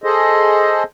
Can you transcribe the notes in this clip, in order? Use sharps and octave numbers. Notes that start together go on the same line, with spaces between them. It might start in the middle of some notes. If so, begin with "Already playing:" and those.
G#4 A4 C5 D#5